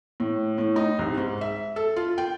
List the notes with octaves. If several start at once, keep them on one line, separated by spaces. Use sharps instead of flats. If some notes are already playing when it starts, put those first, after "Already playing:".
A2
A2
D#4
C2
G#2
E5
A4
F4
G5